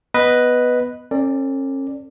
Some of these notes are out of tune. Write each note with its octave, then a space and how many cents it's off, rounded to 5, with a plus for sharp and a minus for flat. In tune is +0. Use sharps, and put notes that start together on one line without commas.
B3 +0 B4 +0 D#5 +0
C#4 -40 A4 +40 D5 +0